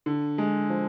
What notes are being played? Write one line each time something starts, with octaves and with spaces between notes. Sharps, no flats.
D3
G#3
F3